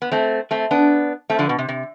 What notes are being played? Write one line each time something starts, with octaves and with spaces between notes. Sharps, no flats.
B3
A3 C4
A3 C4
B3 D4
A3 C4
D3 F3
B2
C3
C3